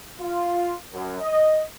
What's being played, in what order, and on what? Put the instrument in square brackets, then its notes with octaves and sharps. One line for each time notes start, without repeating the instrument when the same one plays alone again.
[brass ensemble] F4
F#2
D#5